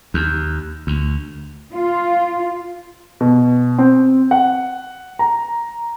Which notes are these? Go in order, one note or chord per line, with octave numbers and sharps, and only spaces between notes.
D#2
D2
F4
B2
C4
F#5
A#5